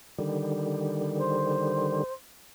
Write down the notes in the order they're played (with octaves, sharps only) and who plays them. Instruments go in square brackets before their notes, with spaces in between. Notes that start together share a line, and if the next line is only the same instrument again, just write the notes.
[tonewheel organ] D3 D#3 G3
[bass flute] C5